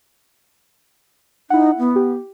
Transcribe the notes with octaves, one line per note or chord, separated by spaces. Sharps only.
D#4 E4 F#5
B3
G4